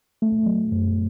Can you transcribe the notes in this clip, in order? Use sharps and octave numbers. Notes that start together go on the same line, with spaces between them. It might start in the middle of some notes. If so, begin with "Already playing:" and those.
A3
F#3
F#2